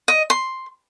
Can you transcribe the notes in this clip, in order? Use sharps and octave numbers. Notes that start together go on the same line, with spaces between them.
D#5
C6